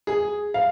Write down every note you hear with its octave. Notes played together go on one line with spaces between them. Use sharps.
G#4
F5